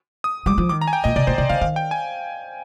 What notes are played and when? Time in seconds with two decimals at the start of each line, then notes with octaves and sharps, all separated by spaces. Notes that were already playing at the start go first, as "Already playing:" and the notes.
0.24 D#6
0.46 G3 D6
0.58 F3
0.69 D#3 D6
0.81 A#5
0.88 G#5
0.93 G5
1.04 A#2 D#5
1.16 C3 D5
1.27 A#2 C5
1.38 C3 D5
1.50 D3 F5
1.61 D#3 F5
1.76 G5
1.91 G#5